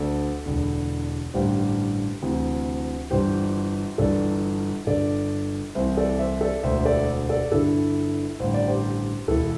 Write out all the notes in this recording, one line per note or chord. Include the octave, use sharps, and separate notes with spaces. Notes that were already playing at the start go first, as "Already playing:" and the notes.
Already playing: D2 D3 A4 D5
E1 E2 D3
A1 G2 D3 G4 C5
D2 C3 E3
G1 G2 E3 G4 C5
G1 G2 E3 A4 D5
G1 G2 D3 A4 D5
C2 C3 E3 C5 E5
A4 D5
C5 E5
A4 D5
E1 D2 D3 C5 E5
A4 D5
A4 D5
G1 G2 D3 E4 A4
A1 G2 D3 C5
D5
G4 C5
E1 E2 E3 E4 A4